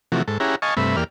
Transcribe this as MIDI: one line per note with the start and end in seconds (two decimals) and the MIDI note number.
0.12 0.22 48
0.12 0.22 52
0.12 0.22 53
0.12 0.22 57
0.12 0.22 66
0.28 0.38 44
0.28 0.38 69
0.40 0.55 61
0.40 0.55 64
0.40 0.55 67
0.40 0.55 68
0.40 0.55 78
0.40 0.55 82
0.62 0.74 75
0.62 0.74 77
0.62 0.74 80
0.62 0.74 81
0.62 0.74 85
0.77 0.96 43
0.77 0.96 48
0.77 0.96 57
0.77 0.96 76
0.77 0.96 83
0.97 1.04 40
0.97 1.04 58
0.97 1.04 67
0.97 1.04 74
0.97 1.04 89